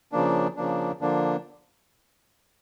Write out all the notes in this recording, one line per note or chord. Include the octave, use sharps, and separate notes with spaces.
C#3 F3 A#3 D4
C#3 F3 A#3 D4
D3 F3 A#3 D4